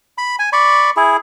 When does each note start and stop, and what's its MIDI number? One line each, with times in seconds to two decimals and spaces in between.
0.18 0.36 83
0.39 0.50 80
0.53 0.90 74
0.53 0.90 83
0.53 0.90 85
0.97 1.17 64
0.97 1.17 68